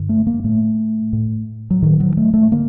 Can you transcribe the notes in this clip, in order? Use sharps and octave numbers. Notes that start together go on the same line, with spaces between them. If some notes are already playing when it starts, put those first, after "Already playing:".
Already playing: G2 D3
A3
A#3
A2 A3
A2
F#3
A2 D#3
F#3
A3
A3
D3 A#3